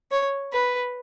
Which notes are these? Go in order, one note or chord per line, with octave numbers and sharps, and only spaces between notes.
C#5
B4